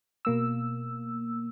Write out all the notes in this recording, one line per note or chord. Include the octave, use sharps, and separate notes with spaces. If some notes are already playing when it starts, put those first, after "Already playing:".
B2 A#3 E6